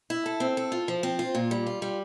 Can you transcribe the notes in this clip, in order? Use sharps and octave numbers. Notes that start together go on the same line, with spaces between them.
E4
A4
C4
A4
F4
F3
C4
F4
A#2
G3
F4
G3